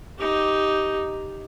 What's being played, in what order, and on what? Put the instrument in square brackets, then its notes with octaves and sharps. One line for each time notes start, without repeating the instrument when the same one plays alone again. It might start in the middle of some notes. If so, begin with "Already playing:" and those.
[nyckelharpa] D#4 G4